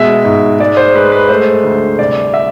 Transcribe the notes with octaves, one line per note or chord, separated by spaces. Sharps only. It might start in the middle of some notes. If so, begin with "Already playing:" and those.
Already playing: B2 G#3 E5
G#2
G#3 D5
C5
G#3 B4
B4
A3 C5
D2
C2 D5
E5